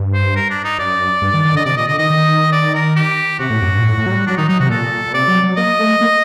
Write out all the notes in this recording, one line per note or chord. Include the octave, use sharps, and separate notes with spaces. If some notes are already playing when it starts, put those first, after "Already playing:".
Already playing: G2
C5
A#4
D4
D#4
F#2 D5
G2
D#3
D#3
D3 D#5
C3 D5
A#2 D#5
D3 D#5
D#3 D#5
D#3
D5
A#4
G4
C3 F#4
A2
F#2
G2
A#2
A2
A2
F#3
G3
F#3 D4
D#3 D#4
F#3 D#4
C3 F#4
A#2 A4
A#2
C3 D5
F#3
F#3
A#3 D#5
A3
A#3